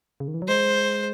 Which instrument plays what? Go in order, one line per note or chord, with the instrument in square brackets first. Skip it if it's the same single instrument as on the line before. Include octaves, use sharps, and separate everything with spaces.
[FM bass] C#3
D#3
E3
F#3
[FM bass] G#3 [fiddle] C5